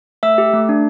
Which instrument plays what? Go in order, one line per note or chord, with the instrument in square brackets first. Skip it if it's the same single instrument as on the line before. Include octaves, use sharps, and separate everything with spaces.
[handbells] A3 E5 E6
G4
A3
D4